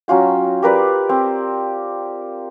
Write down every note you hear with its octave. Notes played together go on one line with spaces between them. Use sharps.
F#3 C#4 F4 G5
G4 A#4 B4 D5
C4